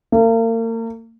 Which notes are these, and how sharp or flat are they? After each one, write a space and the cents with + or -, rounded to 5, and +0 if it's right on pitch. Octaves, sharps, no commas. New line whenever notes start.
A#3 -40